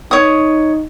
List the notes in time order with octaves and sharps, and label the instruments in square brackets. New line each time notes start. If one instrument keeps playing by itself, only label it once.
[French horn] D#4 [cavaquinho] C#5 D#6